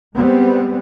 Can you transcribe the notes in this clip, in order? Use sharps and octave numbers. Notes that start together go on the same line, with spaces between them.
G3 G#3 B3 C4